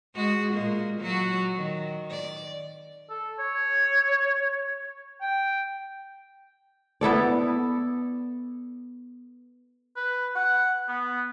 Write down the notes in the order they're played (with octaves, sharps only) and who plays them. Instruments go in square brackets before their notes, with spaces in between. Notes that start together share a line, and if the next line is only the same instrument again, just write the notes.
[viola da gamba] G#3 F#4 G#4
A#2 G#3 A#3
F#3 F#4
D#3
D5
[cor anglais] A4
C#5
G5
[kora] B3 E4 A4 D5
[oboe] B4
F#5
B3